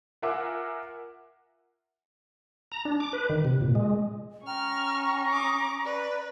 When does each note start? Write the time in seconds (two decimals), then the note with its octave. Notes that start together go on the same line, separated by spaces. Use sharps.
0.22 F4 A#4 E5 F#5 G#5 D6
2.72 A#5
2.85 D4
3.00 D6
3.13 B4
3.29 D#3
3.45 C3
3.61 A#2
3.75 G#3
4.47 C#4 G5 A#5 C#6 F6
5.32 D6 D#6
5.85 B4 D5